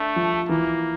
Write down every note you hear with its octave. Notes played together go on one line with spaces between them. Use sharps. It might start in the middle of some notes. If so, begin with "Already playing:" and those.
Already playing: A3 D4
F3
E3 A#3